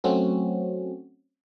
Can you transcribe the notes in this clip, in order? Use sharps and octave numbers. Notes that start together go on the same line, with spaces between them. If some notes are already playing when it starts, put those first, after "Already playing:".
F#3 A3 C4 C#4 F#4